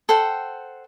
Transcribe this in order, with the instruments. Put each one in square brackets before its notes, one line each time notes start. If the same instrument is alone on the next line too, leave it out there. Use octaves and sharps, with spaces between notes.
[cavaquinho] A4 C5 F#5 G5